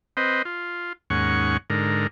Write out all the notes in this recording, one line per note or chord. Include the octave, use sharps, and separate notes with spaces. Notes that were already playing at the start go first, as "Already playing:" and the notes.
C4 B4 C5 D#5
F4
D#2 G#2 C#4 F#5 C#6
G#2 D3 A#4